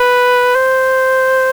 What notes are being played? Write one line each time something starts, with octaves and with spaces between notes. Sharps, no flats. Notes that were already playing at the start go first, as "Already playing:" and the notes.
Already playing: B4
C5